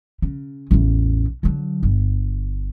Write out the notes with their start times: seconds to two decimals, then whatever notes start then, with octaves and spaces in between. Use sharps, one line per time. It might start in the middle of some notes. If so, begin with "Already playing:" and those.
0.22 C#3
0.71 A1 E2
1.43 D3 F#3
1.83 G1